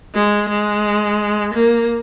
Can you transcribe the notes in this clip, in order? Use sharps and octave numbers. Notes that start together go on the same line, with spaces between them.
G#3
G#3
A#3